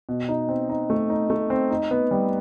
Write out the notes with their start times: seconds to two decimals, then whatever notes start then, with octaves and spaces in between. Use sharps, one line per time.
0.09 B2
0.29 D#4
0.49 C4
0.69 D#4
0.90 A3
1.10 D#4
1.30 A3
1.50 C4
1.70 D#4
1.91 B3
2.11 G3